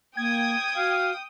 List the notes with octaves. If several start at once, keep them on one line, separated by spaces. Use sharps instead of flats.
A#3 G5 D#6 G#6
F#4 F5